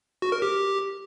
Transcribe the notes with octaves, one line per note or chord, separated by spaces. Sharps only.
F#4
A#4
G4